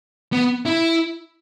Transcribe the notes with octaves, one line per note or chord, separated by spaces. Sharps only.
B3
E4